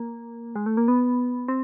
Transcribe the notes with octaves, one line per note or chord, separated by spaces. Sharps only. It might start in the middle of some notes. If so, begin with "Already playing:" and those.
Already playing: A#3
G#3
A3
A#3
B3
C4